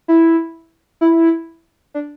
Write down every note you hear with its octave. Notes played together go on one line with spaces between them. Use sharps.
E4
E4
D4